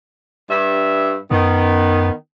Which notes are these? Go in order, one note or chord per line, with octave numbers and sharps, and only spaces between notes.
G2 E5
F#2 D#3 B3